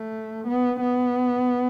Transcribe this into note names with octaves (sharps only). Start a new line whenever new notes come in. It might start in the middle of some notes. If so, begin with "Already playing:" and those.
Already playing: A3
B3
B3